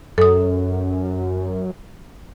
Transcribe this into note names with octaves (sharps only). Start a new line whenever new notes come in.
F#2 A4 D#6